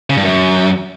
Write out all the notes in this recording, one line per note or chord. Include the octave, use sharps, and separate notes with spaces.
C#3
G2
F#2